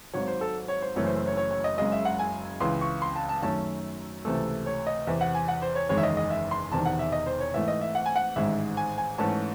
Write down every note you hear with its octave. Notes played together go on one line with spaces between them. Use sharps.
G#1 G#2 F#3 C#5
C5
A4
C#5
C5
F#1 F#2 E3 A3 C#4 C#5
C5
C5
C#5
C#5
C#5
D#5
F#1 F#2 C#3 G#3 D#5
E5
F#5
G#5
C#2 C#3 E3 C6
C#6
C6
A5
A5
F#2 D#3 A3 C#4 A5
C#2 C3 E3 A3 A4
C#5
D#5
E2 C3 E3 E5
F#5
G#5
F#5
C5
C#5
F#1 E2 D#3 G#3 C#5
E5
D#5
D#5
E5
C6
E1 E2 C3 D#3 A5
F#5
E5
D#5
C5
C#5
G#2 E3 A3 E5
D#5
E5
F#5
G#5
F#5
A1 G#2 D#3 G#3 E5
G#5
G#5
G#2 E3 A3 C#4 A5